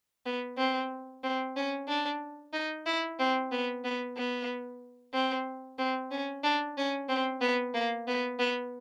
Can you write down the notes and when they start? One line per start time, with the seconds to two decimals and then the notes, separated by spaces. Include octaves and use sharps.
0.26 B3
0.58 C4
1.23 C4
1.56 C#4
1.88 D4
2.53 D#4
2.86 E4
3.19 C4
3.52 B3
3.84 B3
4.17 B3
5.14 C4
5.79 C4
6.11 C#4
6.44 D4
6.77 C#4
7.09 C4
7.41 B3
7.74 A#3
8.08 B3
8.39 B3